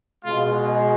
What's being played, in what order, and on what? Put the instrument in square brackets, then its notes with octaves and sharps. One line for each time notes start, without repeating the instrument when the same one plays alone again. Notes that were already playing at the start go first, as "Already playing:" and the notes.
[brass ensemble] B2 G#3 F4